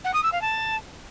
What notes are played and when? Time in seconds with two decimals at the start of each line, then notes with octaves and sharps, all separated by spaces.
0.05 F#5
0.14 D#6
0.23 E6
0.32 F5
0.42 A5